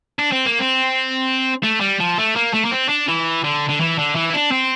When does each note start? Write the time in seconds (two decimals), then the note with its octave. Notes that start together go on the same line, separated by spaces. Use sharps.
0.19 D4
0.32 C4
0.46 A#3
0.60 C4
1.64 A3
1.81 G3
2.00 F3
2.18 A3
2.36 A#3
2.54 A3
2.65 A#3
2.72 C4
2.89 D4
3.08 E3
3.44 D3
3.69 D3
3.80 E3
3.99 D3
4.15 E3
4.30 E4
4.34 D4
4.52 C4